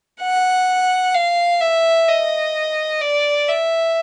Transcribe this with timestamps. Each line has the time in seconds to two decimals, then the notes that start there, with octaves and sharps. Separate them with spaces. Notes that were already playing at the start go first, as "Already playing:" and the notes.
0.21 F#5
1.14 F5
1.61 E5
2.08 D#5
3.01 D5
3.49 E5